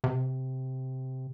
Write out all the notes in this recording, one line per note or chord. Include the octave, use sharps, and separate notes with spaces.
C3